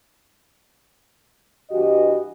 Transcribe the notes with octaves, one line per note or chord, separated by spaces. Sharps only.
G2 E3 F#4 G4 D#5